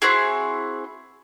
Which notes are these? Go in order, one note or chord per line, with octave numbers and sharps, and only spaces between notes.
C4 E4 F#4 G#4